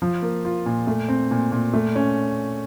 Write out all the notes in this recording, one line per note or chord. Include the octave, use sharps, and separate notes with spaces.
F3
A#3
F4
A#2
A3
C4
A#2
A#2
A3
C#4